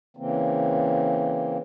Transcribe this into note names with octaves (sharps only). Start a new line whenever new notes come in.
C#3 E3 A#3 C4